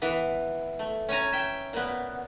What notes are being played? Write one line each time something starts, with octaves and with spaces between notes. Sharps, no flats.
E3 B3
A3
C#4 C#5 G#5 A#5
E5 G5
A#2 B3